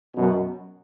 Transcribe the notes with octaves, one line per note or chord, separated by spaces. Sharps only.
F#2 B2